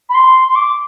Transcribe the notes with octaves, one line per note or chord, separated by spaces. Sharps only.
B5
C6
C6
D6